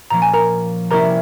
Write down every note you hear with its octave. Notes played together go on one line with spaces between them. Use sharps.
A#2 F3 A#3 C#4 A#5
G#5
A#4 A#5
C3 G3 A#3 C#4 E4 A#4 A#5